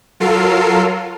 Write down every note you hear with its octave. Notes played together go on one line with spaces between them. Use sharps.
F#3 F4 A4 A#4 C7